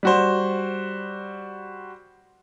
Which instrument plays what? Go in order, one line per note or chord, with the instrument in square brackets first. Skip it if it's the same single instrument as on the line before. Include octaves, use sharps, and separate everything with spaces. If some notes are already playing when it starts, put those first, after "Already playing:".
[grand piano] G3 F#4 C5